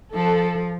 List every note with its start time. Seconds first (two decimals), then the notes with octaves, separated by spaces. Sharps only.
0.15 F3 A4